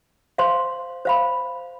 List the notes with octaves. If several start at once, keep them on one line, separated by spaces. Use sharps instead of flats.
C5 F5 C6
C5 F5 B5